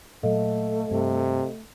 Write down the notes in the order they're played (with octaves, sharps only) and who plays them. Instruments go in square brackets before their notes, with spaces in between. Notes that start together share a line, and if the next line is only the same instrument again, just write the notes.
[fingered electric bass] A#2 F#3 [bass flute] A3 [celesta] A4 D#5 F5
[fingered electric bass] G2 [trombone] C3